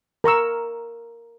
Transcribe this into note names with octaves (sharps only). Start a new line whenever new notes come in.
A#4 A#5 C#6 E6